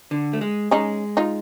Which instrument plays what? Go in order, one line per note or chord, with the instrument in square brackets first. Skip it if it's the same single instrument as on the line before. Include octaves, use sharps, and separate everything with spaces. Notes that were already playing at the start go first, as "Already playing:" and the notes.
[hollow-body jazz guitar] D3
A3
G#3
[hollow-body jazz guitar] G#3 [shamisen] C#4 D#4
[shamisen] D#4 F4